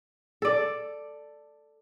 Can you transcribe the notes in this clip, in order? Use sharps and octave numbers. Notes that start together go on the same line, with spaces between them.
A4 D5